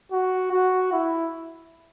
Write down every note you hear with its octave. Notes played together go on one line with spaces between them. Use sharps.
F#4
F#4
E4